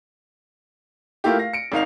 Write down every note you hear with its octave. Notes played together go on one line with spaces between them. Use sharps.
A3 A#3 E4 F4 G4
F5 A#6
C#7 D7
G#1 D#4 F5 F7